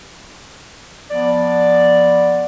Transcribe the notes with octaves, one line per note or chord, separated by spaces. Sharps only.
F3 B3 D5